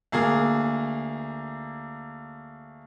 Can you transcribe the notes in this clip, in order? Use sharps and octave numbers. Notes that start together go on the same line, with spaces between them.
D2 A#3 G#4